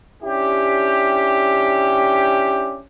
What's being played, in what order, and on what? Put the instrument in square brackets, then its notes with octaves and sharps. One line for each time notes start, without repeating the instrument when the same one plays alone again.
[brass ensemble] C#4 D4 E4 G4